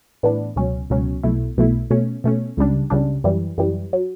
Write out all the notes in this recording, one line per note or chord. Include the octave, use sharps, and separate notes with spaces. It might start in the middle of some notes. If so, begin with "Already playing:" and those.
A2 E3 B3 D4
C#2 B2 F#3 C#4
C#2 B2 F#3 C#4
B1 B2 A3 E4
B1 B2 A3 E4
B2 A3 C#4
B2 A3 C#4
C#2 C#3 G3 D4
C#2 C#3 G3 D4
F#2 E3 G3
F#2 E3 G3
F#3